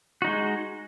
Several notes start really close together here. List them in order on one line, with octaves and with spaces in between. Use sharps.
F#4 D#4 G#3